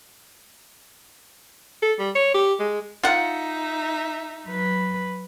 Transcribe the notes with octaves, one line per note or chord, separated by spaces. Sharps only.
A4
G3
C#5
G4
G#3
D#4 F4 E5 F#5
F#3 B4